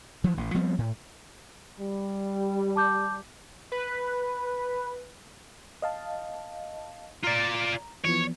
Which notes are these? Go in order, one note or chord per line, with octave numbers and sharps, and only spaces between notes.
E3 F3
A1
F3 G3 B3 C4
A2
G3
A5 D6 G6
B4
D#5 F5 A5
F4 D5 A#5
E3 F3 B3 C#5